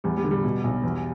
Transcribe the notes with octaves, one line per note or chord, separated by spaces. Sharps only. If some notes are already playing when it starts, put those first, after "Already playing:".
E2 G3
G3
D3
G3
B2
B1
E2